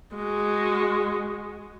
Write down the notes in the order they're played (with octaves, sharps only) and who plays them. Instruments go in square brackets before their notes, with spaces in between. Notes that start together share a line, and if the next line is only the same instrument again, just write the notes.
[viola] G#3 F#4